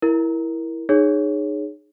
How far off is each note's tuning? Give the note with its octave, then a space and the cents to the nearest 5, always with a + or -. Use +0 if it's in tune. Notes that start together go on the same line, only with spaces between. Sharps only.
E4 +0 A#4 +10
D#4 -30 G#4 +0 C#5 +0